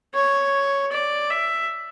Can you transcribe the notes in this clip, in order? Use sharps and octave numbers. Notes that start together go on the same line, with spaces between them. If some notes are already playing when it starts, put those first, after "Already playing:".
C#5
D5
E5